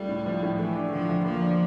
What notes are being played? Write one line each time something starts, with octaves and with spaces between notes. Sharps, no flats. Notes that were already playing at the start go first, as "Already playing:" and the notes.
Already playing: C#2 G3 A3
A2
F3
A2
E3 A3
D4
D3 F3
D2
F3 A#3
D4